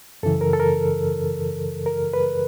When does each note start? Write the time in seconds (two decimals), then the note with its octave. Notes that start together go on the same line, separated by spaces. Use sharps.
0.23 F#2 C#3 E3 A4
0.41 A#4
0.53 A4
0.60 A#4
1.86 A#4
2.13 B4